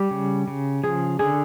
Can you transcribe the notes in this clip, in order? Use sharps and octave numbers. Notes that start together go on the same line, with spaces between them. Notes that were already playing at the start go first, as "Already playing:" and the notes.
Already playing: G3 G4
C#3
C#3
F3 G#4
D3 G#4